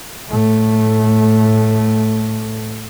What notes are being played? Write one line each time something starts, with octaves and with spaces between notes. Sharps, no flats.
A2 A3